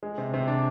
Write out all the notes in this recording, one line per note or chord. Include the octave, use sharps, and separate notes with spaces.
G#3
C3
C3
D4